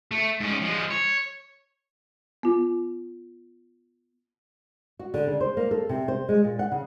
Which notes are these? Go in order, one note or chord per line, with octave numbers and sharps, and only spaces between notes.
A3
G#2 C#4
F3 G#3
C#5
B3 F4
F#4
D3
C#3
C5
A#3
A4
C3
C5
G#3
A#2
F#5
C#3